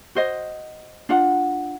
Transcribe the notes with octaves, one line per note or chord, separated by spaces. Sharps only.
F#4 C5 D#5
D4 F4 F#5